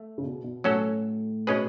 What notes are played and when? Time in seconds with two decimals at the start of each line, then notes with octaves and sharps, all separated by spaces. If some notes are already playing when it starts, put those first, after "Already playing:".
Already playing: A3
0.18 C#3
0.24 B2
0.44 B2
0.64 A2 F#3 C#4 F#4 A4
1.47 B2 G#3 C#4 G#4 B4